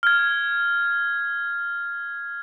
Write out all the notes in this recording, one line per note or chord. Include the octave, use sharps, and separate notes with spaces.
F6 G#6